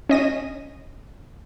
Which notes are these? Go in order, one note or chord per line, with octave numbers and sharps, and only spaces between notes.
C#4 D#5 A#6 D#7